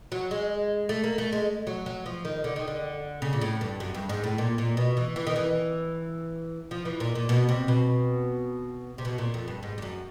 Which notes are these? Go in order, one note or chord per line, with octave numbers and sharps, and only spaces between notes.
F#3
G#3
A3
A#3
A3
G#3
F#3
F#3
F3
D#3
D3
D#3
D3
C#3
A#2
A2
G2
F#2
G2
G#2
A2
A#2
A#2
B2
E3
E3
D#3
E3
F3
E3
A#2
A#2
B2
C3
B2
C3
B2
A#2
F2
G2
G#2
G2
F#2